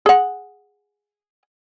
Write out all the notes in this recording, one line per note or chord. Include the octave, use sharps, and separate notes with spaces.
G#4 F#5